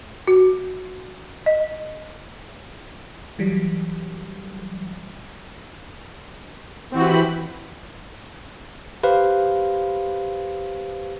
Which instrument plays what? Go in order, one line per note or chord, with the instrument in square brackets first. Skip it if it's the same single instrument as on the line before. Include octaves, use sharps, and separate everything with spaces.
[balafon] F#4
D#5
[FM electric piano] E3 F#3 G3
[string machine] E3 B5 [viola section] C4 F#4 G4
[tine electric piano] G4 B4 C5 F5